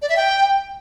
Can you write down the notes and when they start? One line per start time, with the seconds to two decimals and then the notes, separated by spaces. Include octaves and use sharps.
0.02 D5
0.09 E5
0.16 G5